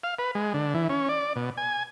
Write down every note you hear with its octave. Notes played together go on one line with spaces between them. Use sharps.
F5
B4
G#3
D3
E3
C#4
D5
B2
G#5